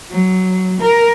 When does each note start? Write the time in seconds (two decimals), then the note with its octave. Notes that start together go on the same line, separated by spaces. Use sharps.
0.10 F#3
0.81 A#4